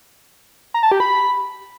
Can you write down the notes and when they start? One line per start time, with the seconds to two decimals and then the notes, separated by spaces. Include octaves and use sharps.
0.74 A#5
0.83 A5
0.92 G4
1.00 B5